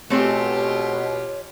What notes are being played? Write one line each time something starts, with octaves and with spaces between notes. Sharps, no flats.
B2 A3 C4 F4 G4 G#4 C#5